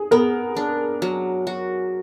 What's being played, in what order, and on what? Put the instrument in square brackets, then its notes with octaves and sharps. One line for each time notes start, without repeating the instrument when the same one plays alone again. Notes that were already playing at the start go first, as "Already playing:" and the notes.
Already playing: [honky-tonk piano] G#4
[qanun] B3 [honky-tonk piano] A#4
[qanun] D4
F#3
F#4